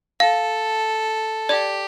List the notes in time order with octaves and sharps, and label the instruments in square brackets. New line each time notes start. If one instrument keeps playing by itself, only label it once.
[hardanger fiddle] A4 [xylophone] F5
[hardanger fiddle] G4 [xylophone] D5